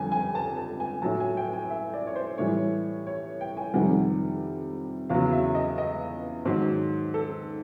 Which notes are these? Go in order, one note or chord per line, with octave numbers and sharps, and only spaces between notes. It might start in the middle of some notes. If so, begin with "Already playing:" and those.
Already playing: F2 D3 G3 G#5
G#5
A5
A5
G#5
A2 F#3 A5
G#5
G5
G#5
E5
D5
C#5
C5
A2 E3 G3 C#5
C#5
G5
G#5
F2 C3 D#3 G3 F#5
E2 C#3 F#3 F5
E5
D#5
D#5
G#2 D#3 F#3
A4